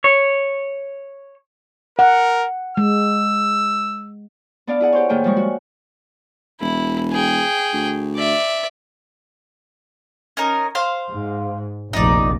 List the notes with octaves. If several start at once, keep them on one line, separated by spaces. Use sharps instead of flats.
C#5
A#4 F#5
G#3 E6
B3 D4 D5 F5
E4 G#4 F#5
G4 C5 C#5
A2 D#3 A#3 G#4 G5
F3 G3 G#3 C#6
F#4
E1 E4
G#4 G5
D2
D5 E5
C#4 D#4 A#4
C5 F5 C6
G#2
F1 A#1 D#4 D5